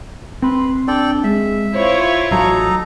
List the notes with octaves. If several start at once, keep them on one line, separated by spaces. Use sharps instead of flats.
C4 B4 C6
D4 A4 D5 G5
G#3 E5
E4 F4 C5 C#5
A1 F#3 D#4 F#4 A4 A#5